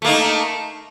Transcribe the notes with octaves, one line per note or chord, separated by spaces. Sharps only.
A3 A#3 D#4